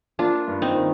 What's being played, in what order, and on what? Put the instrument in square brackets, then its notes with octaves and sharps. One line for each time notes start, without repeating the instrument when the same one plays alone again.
[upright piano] A#3 [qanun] D4 F4
[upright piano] G2
[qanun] C4 D#4
[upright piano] D#3